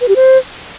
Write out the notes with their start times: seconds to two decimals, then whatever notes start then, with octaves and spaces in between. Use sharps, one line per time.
0.01 B4
0.08 G4
0.16 C5